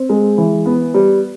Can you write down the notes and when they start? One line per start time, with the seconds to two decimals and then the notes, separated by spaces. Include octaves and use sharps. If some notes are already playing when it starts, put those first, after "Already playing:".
Already playing: C4
0.09 G#3
0.38 E3
0.66 B3
0.94 G3